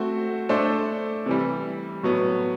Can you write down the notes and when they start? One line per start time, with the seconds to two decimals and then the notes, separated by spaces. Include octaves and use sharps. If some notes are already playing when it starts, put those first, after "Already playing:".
Already playing: A3 C4 F#4 C5
0.49 A3 D4 A4 C5
1.26 C3 E3 G3
2.03 A2 F#3 B3